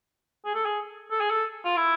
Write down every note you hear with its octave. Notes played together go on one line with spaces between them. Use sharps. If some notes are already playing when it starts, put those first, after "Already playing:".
G#4
A4
G#4
A4
G#4
A4
F4
E4